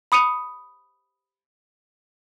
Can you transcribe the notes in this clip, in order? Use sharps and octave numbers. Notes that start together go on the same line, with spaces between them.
B5 D#6 C#7 D#7 F7